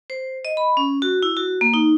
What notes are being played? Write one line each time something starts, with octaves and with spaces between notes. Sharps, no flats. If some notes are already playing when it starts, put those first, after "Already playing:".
C5
D#5
B5
C#4
F#4
E4
F#4
A#3
D#4